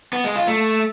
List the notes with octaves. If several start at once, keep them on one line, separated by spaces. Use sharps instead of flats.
B3
G#3
F4
A3